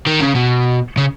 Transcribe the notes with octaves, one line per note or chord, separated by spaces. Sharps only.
D#3
C#3
B2
C#3